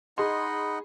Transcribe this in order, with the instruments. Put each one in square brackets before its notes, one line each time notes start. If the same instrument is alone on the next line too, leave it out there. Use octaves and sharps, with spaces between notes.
[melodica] D#4 D#5 F#5 [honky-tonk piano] G#4 C6 [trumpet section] B5